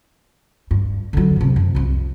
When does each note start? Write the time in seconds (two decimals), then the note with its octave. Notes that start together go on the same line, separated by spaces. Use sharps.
0.71 G2
1.13 D3 F#3
1.36 G#2 C3
1.56 F#2
1.75 C2 F2